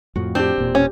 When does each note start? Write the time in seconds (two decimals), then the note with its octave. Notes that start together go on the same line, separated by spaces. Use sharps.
0.16 F2 A2 F3 F#4
0.35 C4 D4 G4
0.58 E1 A#2
0.75 C#4